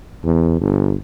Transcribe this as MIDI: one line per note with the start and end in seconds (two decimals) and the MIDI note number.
0.24 0.56 40
0.61 0.94 31